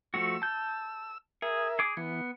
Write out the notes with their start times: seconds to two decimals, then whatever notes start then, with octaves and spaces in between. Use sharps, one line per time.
0.14 F3 A3 F#4 E6
0.42 A5 G6
1.42 G#4 A#4 E5
1.79 G#4 D6
1.97 E3 B3